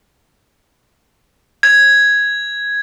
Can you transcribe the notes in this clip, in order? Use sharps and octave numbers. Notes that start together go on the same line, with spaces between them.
G#6